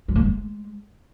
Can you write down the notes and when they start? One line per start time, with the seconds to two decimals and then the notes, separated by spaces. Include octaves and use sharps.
0.08 G3
0.15 A3
0.23 G#3